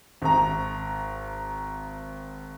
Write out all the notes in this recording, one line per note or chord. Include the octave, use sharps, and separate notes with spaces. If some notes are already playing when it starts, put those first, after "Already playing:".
G#1 A#5